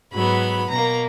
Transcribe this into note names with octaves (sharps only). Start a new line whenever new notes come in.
G#2 F#3 B3 B5
B2 A#3 A#5